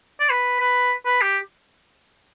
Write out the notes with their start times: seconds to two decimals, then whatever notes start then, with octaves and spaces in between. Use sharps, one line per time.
0.20 D5
0.30 B4
0.60 B4
1.06 B4
1.22 G4